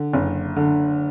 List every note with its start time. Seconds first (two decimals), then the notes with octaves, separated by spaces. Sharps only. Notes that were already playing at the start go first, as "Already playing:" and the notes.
Already playing: D3
0.13 F#1
0.56 D3